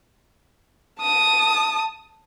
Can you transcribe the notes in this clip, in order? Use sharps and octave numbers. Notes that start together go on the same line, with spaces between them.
A5 D#6